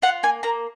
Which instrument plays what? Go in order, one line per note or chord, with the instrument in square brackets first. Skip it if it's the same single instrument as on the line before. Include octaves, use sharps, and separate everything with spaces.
[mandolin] F4 F#5
A#3 G#5
A#3 A#5